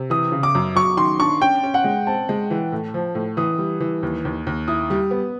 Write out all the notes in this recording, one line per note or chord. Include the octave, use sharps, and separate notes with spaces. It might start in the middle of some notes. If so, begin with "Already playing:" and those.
Already playing: C3
E3 D#6
C#3
D6
F#2
F#3 C#6
D#3 C6
D4 C#6
C#4 G5
C#4
F#5
G#3
C4 A5
G#3
E3
A2
F3
A2
E3 D#6
G3
E3
D#2
D#2
D#2
E4 D#6
G3
B3